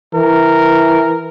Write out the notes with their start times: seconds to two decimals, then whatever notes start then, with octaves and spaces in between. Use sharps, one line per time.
0.14 E3 A#4